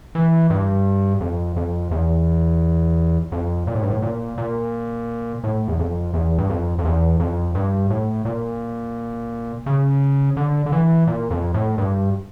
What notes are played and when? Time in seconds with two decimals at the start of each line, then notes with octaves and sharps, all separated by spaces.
0.15 E3
0.50 G2
1.20 F2
1.56 F2
1.91 E2
3.32 F2
3.67 A#2
3.75 A2
3.82 G2
3.90 A2
4.02 A#2
4.38 A#2
5.44 A2
5.68 E2
5.79 F2
6.14 E2
6.38 G2
6.49 F2
6.79 F2
6.84 E2
7.20 F2
7.55 G2
7.90 A2
8.25 A#2
9.66 C#3
10.37 D3
10.66 D3
10.72 E3
11.07 A#2
11.30 F2
11.54 A2
11.78 G2